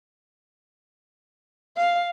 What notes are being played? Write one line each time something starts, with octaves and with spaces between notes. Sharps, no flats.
F5